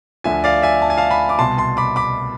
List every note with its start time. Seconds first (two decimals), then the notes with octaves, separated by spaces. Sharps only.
0.24 D2 D3 F3 E5 G#5
0.44 D5 F5
0.62 E5 G#5
0.82 A5
0.90 G#5
0.97 F5 A5
1.11 G#5 B5
1.29 D6
1.39 C2 B2 A5 C6
1.58 A5 C6
1.77 B5 D6
1.96 B5 D6